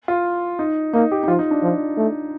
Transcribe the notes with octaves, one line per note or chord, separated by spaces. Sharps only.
F4
D#4
A#3 D#4
G4
D#4
F3 F4
D#4
D4
F3
A3